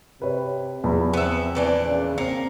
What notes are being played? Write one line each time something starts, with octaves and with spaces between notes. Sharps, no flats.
C3 B4 C#5
E2 F3 B5
B3 C4 E5
A#2 E3 D4
C#3
A#3 C4 C#7